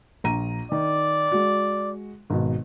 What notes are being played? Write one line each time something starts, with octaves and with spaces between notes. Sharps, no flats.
A#1 A#5 D#7
D#3 D5
G#3 F#4
G#1 B2